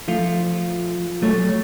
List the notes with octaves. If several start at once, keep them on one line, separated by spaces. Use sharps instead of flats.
F3 A3 F4
F#3 A3 C#5